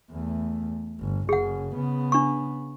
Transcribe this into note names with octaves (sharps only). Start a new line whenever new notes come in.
E2 A3
G1
F#1 C#3 G#4 F#5
C#3 B3
D4 C#6